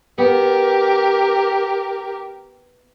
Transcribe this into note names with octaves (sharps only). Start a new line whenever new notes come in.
B3 G4 A#4